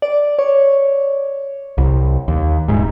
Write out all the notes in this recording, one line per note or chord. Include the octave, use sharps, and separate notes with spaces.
D5
C#5
C2
D#2
D#1 G#2